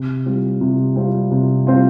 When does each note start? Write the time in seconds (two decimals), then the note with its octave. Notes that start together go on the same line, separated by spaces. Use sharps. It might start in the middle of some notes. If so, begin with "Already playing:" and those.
Already playing: C3
0.26 G3 C4 F4
0.61 C3
0.96 G3 C4 F4
1.31 C3
1.67 G3 C4 F4